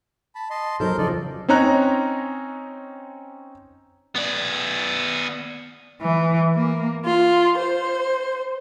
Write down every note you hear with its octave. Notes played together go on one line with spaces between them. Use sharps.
A5 B5
D#5 A5 C6
F#3 D#4 A4 A#4 C5 G6
C#3 F3 A4 D5 D#5
C4 C#4 D#4 C#5 A#5 F#6
B3 D5
E3
A#3
F4
C5